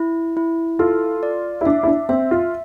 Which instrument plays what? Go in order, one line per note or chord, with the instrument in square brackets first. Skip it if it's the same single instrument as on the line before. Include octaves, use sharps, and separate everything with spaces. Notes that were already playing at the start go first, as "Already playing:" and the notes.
Already playing: [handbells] E4
E4
[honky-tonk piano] F4 [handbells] A4
[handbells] D5
[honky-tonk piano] E4
[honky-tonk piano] D4 [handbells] E5
[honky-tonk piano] E4
D4
[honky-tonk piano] C4 [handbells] E5
[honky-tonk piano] F4